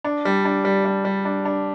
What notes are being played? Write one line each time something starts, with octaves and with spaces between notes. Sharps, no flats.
D4
G3
D4
G3
G3
G3
D4
D4